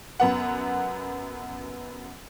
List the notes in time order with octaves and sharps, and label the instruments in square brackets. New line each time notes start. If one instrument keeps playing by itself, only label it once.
[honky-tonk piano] F#2 B3 F#5